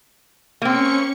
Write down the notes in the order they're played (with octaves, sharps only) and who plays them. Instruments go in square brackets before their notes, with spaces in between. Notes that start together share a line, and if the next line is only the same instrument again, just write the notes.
[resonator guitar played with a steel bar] A#3 C4 [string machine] C#4 C#6 C#7